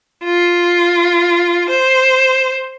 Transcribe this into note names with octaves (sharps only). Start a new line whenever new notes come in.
F4
C5